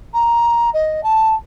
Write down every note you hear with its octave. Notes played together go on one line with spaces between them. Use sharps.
A#5
D#5
A5